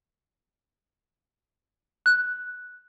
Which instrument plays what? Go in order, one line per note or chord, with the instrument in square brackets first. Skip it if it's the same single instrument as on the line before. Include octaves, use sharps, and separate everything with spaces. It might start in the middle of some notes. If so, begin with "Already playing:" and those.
[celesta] F#6